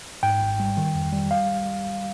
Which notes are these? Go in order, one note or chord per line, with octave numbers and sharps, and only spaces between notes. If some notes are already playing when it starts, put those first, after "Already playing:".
G#2 G5
G#1
G3
D#3
F2
G3
F5